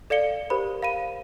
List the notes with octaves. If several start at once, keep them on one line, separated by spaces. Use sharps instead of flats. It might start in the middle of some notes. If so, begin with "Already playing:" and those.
A4 D5 F5 C#7 G7
G4 A#4 C5 B5
F5 B5 D#7